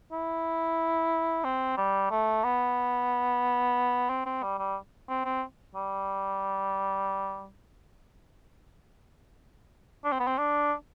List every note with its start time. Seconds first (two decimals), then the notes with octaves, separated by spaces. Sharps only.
0.12 E4
1.44 C4
1.77 G3
2.11 A3
2.44 B3
4.10 C4
4.26 C4
4.43 G3
4.59 G3
5.09 C4
5.25 C4
5.75 G3
10.04 D4
10.12 C4
10.20 B3
10.27 C4
10.38 D4